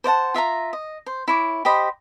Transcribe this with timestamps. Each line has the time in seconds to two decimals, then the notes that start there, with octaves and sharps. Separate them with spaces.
0.04 C5 D5 F#5 A5
0.34 F4 E5 F5 A#5
0.73 D#5
1.06 C5
1.28 E4 C#5 D6
1.65 G4 C5 D#5 B5